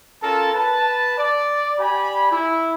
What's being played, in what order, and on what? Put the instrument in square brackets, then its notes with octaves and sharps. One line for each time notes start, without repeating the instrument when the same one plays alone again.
[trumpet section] C#4 F4 A4 A#4 A5
B4 A5
D5
G4 D5 G#5 B5
E4